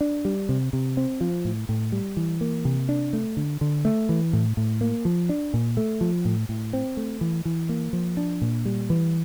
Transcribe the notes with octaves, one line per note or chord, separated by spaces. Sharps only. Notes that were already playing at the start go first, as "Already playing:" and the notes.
D4
G3
C3
C3
C4
F3
A2
A2
G3
E3
A#3
C3
D4
A3
D3
D3
A3
E3
A2
A2
A#3
F3
D4
A#2
A3
F3
A2
A2
C4
A3
E3
E3
A#3
F3
D4
A#2
G3
E3